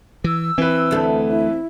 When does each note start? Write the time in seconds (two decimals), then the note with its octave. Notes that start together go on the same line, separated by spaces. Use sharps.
0.24 E3 E6
0.58 E3 C4 B4
0.91 D2 A3
1.28 E4